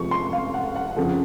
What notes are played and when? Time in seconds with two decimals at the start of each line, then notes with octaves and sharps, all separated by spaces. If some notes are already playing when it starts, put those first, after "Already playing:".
Already playing: F1 F2 C3 F3 G#3 C#6
0.11 C6
0.33 F5
0.54 F#5
0.76 F#5
0.96 F#1 F2 C#3 F3